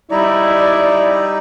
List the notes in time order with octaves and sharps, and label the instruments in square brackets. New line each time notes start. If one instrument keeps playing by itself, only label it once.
[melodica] G3 D#4 A#5 [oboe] E4 [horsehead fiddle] D5